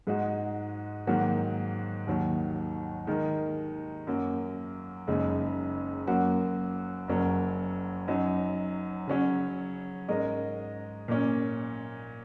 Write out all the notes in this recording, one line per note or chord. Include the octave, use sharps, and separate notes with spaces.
G#2 G#3 D#4 F#4
G#2 D#3 F#3 A#3 F#4
D#2 D#3 F#3
D#3 G#3 D#4 A#4
F#2 F#3 A#3
F#1 F#2 C#3 G#3 D#4
F#2 F#3 A#3 F#4
F#1 F#2 F#3 C#4 A#4
F#2 F#3 D#4
C#3 F#3 C#4
G#2 G#3 C#4 A#4 D#5
A#2 A#3 C#4